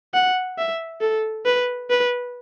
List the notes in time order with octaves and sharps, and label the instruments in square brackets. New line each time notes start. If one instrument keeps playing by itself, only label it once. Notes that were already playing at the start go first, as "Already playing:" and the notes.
[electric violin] F#5
E5
A4
B4
B4